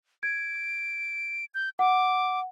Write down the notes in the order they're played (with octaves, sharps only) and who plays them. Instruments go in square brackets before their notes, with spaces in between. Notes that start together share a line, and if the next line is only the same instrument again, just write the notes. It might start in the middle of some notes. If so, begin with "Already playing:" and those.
[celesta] G#6 [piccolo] D7
[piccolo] G6
[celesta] F#5 [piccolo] D6